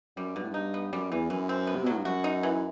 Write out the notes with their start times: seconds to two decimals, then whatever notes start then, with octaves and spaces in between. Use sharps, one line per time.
0.17 F#2 G3
0.36 G2 B2
0.43 A2
0.51 G2 D#4
0.74 B3
0.92 F#2 G3
1.11 E2 E3
1.30 F#2 E3
1.49 C4
1.67 B3
1.75 C3
1.83 B2
1.86 A2 F#3
1.98 G2
2.05 F#2 F#4
2.24 D#4
2.43 E3